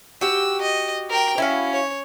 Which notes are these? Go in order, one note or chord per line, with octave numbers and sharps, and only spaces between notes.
F#4 G4 E6
D#5
A#4 G5
C#4 E4 F#4 F5
C#5